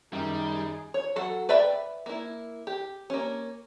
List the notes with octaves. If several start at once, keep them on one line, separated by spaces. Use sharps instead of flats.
F#2 D#3 G3 D#4 G#4
C#5
F#3 F#4 A4 F#5
B4 D5 E5 G5 B5
A#3 E4
G4
A#3 C#4